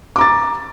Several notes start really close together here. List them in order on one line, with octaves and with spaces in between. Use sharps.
D6 A#5 A6